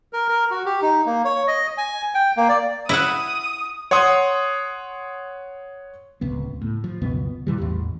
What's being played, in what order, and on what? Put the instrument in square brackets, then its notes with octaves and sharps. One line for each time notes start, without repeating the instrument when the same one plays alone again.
[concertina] A#4
A#4
F#4
G4
D#4
A#3
C#5
D#5
G#5
G5
A#3
D5
[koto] E4 E5 F#5 [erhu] D#6
[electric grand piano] C#5 F#5 C6 D#6
[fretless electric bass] D1 C#2 B3
A2
F3
F#1 C#2 B2 B3
A#2 E3 G3
A1 E2